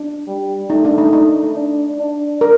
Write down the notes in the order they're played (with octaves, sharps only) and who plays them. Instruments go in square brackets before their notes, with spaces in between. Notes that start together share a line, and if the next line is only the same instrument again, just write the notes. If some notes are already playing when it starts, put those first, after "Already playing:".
Already playing: [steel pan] D4
[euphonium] G3
[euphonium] A3 [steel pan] D#4
[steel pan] D4
D#4
D#4
[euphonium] D4
D4
[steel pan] A#4